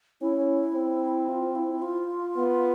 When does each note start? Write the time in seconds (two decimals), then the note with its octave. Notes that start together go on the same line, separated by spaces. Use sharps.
0.21 C#4 E4
0.75 C4
1.29 F4
1.55 E4
1.82 F4
2.36 B3